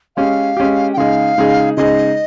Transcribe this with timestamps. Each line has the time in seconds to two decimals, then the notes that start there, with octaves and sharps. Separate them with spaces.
0.17 G#3 C#4 G4 F5
0.57 G#3 C#4 G4
0.93 G5
0.97 C#3 G#3 D#4 G#4 F5
1.38 C#3 G#3 D#4 G#4
1.77 C#3 G#3 D#4 G#4 D#5